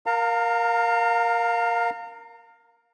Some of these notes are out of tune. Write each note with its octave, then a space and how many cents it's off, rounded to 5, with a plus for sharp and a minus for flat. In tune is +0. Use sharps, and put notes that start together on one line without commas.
A#4 +5 F5 +15 A#5 -35